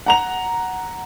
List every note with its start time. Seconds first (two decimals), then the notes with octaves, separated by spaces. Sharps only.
0.06 F#5 A#5 F7